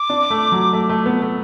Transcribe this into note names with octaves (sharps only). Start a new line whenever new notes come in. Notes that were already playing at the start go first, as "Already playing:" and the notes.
Already playing: D6
D4
A3
F#3
A3
A3
B3
A3